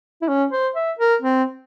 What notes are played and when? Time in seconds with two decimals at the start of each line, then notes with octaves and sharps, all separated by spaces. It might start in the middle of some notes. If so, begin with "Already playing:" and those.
0.22 E4
0.28 C#4
0.52 C5
0.75 E5
0.99 A#4
1.22 C4